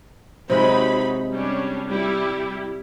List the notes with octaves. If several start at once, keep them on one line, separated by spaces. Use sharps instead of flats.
C3 F#3 G#3 D#4 G5 B5
G3 C#4 D4
G3 E4 G4